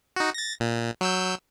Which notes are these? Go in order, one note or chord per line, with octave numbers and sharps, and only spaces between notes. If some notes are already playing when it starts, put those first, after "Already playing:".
D#4 F#4
A6 A#6
A#2
F#3 E6 G6